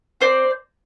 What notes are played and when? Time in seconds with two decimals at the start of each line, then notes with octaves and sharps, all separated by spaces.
0.21 C4 C5 D5